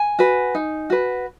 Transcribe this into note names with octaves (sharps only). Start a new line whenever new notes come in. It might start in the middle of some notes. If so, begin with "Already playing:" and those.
Already playing: G#5
F#4 B4
D#4
F#4 B4